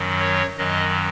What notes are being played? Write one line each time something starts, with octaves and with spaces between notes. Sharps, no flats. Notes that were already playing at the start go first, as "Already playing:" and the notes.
Already playing: F#2 D#3 F#3
C#5
F#2 D#3 F#3 D#5